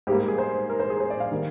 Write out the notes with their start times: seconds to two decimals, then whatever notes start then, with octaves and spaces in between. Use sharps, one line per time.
0.07 G#2 G3 A#3 G4
0.18 G4
0.28 G#4
0.38 C5
0.70 A#4
0.80 C5
0.90 G#4
1.00 C5
1.10 D5
1.20 F5
1.32 D#3 G3 A#3